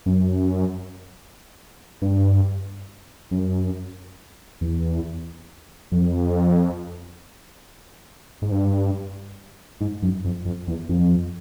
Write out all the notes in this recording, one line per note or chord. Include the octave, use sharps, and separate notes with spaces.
F#2
G2
F#2
E2
F2
G#2
G2
G#2
F#2
F2
F2
E2
F2